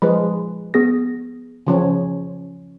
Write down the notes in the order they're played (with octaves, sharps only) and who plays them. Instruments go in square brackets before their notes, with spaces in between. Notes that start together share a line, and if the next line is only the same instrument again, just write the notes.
[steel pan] F3 G#3 [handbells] B4 B5
[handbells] B3 G#4 A#6
[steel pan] C#3 F3 C#4